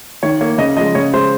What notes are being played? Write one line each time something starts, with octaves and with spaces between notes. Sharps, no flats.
D#3 C#5
A#3 C#5
C#3 D#5
F3 G#3 D#5
C#3 C#5
G#3 C5